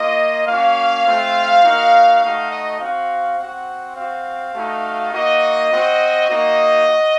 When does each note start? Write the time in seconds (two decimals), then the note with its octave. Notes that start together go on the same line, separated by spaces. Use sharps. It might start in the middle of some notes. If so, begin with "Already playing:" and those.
Already playing: A#3 F4 D#5
0.47 A#3 C#4 F#4 F5
1.05 A3 C4 F4
1.64 A#3 D#4 F#4
2.22 A3 D#4 F#4 F5
2.51 D#5
2.80 C4 F#4 F5
3.38 C4 F#4 F#5
3.96 C4 F#4 F5
4.54 A3 D#4 F#4
5.13 A#3 D#4 F#4 D#5
5.71 C4 F#4
6.29 A#3 D#4 F#4 D#5
6.88 F#4